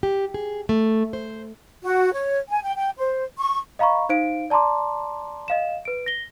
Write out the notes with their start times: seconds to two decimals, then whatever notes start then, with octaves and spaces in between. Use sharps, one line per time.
0.03 G4
0.34 G#4
0.69 A3
1.13 C5
1.82 F#4
2.12 C#5
2.49 G#5
2.63 G5
2.76 G5
2.97 C5
3.38 C#6
3.79 D#5 F5 A#5 B5 C#6
4.09 D#4 C5 F5 D7
4.50 D5 A5 A#5 C6 D6
5.48 D#5 F5 E7
5.85 B4 D7
6.06 A#6 G7